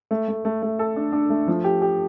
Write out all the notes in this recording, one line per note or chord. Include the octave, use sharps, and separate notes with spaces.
A3
A3
A3
A3
A4
D4
D4
A3
F3
G4
G4